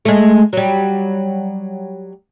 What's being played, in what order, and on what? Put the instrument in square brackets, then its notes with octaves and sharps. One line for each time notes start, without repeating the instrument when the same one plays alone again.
[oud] G#3 A3
F#3 G3